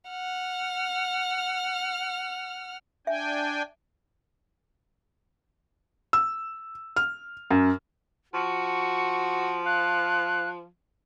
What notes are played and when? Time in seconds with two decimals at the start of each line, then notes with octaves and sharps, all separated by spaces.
0.10 F#5 F6
3.07 D4 E5 G5 G#5
6.13 E6
6.96 F6
7.50 F#2
8.34 F3 F#4 C#6
9.65 F5 F#6